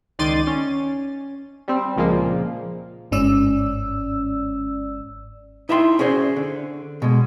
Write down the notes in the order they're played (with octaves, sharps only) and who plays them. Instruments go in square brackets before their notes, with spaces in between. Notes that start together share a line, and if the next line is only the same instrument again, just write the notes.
[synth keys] C#2 D#3 D5 C6 A6 D#7
C#4
G3 C4
C#2 A#2 F3 G#3 A#3
[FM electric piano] G1 G#2 C#4 D5 E6
[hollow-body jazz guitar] D#4 E4 E5 G5 A#5 C6
C#4 F#4 G#4 C5 D5
D3
B2 G#3